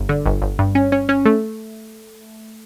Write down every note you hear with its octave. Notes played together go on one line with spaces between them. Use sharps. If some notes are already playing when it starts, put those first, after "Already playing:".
Already playing: G1
D3
G1
G1
G2
C#4
C#4
C#4
A3